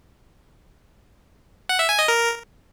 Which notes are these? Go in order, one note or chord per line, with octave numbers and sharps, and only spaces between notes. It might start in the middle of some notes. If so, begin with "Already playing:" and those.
F#5
E5
G#5
D#5
A#4